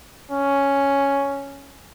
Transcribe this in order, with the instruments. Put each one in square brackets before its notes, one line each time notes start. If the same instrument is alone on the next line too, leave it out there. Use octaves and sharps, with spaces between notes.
[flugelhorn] C#4